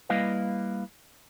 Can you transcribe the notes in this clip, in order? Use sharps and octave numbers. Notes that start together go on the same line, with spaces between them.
G3 A#3 E4 B4 D#5 F5